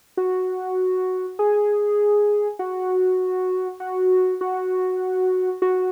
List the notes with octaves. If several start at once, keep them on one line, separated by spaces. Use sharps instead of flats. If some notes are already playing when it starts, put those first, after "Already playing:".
F#4
G#4
F#4
F#4
F#4
F#4